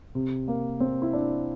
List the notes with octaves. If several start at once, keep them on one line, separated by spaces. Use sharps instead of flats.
C3
A#3
C4
E4
D4